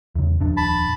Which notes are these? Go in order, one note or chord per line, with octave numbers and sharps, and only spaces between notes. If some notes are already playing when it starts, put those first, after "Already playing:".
E2 C#3
D#1 F2 D4
A5 B5